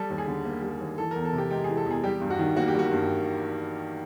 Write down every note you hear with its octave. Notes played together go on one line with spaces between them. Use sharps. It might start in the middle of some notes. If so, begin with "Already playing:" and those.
Already playing: G3 A4
D#2
G#4
D3
A#3
G3
D#2
E3 A4
E2 A#4
A4
C3
G4
G#3 G4
E3 G#4
A4
E2 G#4
G3 G4
G2
F#4
D#3
A#3 F#4
G4
G3 F#4
G2